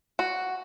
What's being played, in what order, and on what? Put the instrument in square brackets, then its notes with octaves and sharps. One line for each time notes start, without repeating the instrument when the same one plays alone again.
[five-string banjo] F#4